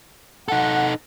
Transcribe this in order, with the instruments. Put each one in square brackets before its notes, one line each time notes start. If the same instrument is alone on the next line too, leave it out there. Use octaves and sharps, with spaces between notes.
[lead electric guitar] D#4 A4 [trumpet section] F#5